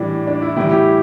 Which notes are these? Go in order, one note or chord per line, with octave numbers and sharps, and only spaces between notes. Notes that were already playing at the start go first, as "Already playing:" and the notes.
Already playing: A2 E3 G3 D4
D4
E4
A2 E3 G3 E4
G4